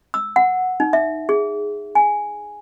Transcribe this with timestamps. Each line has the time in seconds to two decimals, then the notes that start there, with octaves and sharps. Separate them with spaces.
0.14 E6
0.36 F#5
0.80 D#4
0.93 E5
1.29 G#4
1.95 G#5